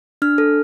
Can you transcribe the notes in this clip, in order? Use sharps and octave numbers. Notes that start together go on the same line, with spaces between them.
D4 F6
A4